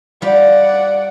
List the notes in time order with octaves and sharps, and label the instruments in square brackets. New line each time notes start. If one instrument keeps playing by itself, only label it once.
[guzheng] G3 F4 [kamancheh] D5 F#5